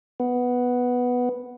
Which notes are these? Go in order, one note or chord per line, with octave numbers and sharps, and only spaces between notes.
B3